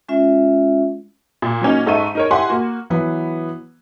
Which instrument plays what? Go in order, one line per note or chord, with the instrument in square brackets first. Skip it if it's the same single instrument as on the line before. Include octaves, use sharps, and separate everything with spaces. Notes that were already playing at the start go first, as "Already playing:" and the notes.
[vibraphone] G#3 C#4 F4 E5
[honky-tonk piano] A#2
F#3 A#3 C#4 D#4
G#2 D#4 A4 E5 C#6 D#7
D#4 A#4 C#5
E4 G4 F#5 G#5 C6
A#3 F#4
[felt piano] E3 F#3 B3